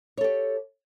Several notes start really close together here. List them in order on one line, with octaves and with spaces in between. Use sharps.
C#5 A4 G4